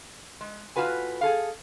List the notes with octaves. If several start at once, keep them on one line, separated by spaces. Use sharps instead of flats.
G#3
A2 A3 F4 F#4 B4 G#5
G#4 A4 F5